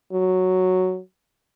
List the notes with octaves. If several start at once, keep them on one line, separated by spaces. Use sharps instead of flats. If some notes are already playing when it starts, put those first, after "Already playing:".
F#3